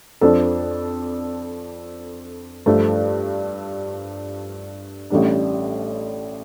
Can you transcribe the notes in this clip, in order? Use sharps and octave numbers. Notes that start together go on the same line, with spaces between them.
F2 F3 D4 A4
G2 F3 A3
A1 A2 G3 D4